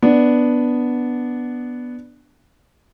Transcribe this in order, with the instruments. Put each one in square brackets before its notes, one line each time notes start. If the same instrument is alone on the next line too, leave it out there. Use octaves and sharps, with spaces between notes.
[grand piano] B3 D4